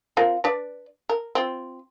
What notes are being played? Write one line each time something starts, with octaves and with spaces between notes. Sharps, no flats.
C4 F4 A#4
D4 B4 D5
A#4
C4 F4